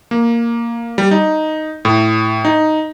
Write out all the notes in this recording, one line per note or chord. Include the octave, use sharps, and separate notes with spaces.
A#3
G3
D#4
A2
D#4